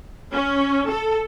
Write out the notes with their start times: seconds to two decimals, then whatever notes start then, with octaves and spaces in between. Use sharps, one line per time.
0.32 C#4
0.89 A4